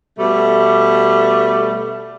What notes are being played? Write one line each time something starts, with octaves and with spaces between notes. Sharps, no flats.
B2 G3 A3